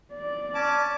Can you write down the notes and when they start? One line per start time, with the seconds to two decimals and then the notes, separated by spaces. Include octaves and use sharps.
0.13 D5
0.55 C#4 A5 D6